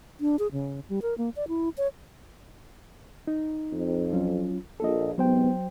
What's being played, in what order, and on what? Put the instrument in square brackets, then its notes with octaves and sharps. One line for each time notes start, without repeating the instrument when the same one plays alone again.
[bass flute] D4
G#4
C#3
G3
A#4
A#3
D5
E4
C#5
[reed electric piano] D#4
[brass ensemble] F2
[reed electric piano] F#3 C#4 F4
[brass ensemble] A#1 [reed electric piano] A4 D#5
[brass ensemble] G#2 C3 B3 [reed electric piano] F#3 C5 G5